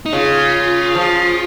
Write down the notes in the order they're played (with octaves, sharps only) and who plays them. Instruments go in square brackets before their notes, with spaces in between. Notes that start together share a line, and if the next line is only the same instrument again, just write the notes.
[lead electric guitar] D#4
[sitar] C#3 [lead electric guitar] F4
[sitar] F3